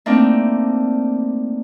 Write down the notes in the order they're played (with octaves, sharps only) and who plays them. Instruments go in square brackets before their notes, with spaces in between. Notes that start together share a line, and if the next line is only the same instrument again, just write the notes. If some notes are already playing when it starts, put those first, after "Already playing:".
[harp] A3 A#3 C4 D4 D#4